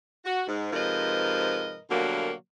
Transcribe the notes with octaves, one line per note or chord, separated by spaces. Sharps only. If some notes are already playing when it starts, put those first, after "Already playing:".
F#4
G#2
G#2 C3 F3 A#4 B4 D#5
B2 D3 F#3 G3 A#3